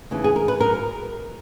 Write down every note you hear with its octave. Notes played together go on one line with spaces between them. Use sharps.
D#2 C#3 E3
G#4
A#4
B4
F#3 A#4